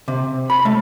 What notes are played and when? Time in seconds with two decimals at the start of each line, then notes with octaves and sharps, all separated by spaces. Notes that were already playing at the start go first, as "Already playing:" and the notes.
0.08 C3
0.50 B5
0.65 A3